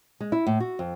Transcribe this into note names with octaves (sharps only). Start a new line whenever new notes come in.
G#3
E4
A2
F#4
F2